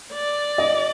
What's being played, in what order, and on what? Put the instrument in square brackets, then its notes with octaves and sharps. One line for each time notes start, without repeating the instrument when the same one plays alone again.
[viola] D5
[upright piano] D#5